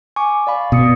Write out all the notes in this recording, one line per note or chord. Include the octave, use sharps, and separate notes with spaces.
G#5 C#6 D6
D5 F5 B5
B2 B5 D#6 C#7